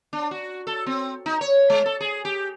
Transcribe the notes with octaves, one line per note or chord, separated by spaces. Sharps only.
D4
F#4
A4
C4
D#4
C#5
G#3
A4
G#4
G4